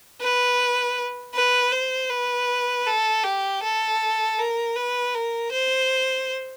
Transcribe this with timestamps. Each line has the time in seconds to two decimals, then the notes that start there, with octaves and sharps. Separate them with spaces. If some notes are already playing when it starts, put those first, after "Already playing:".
0.21 B4
1.35 B4
1.72 C5
2.10 B4
2.87 A4
3.24 G4
3.63 A4
4.39 A#4
4.76 B4
5.14 A#4
5.52 C5